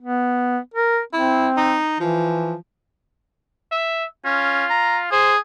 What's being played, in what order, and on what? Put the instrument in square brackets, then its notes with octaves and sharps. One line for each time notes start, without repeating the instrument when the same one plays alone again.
[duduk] B3
A#4
[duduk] C4 [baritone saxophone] E4
[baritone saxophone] D#4
[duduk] E3 [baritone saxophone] F3
[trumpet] E5
[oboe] C#4 [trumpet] F4
[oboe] A#5
[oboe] G#4 [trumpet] C5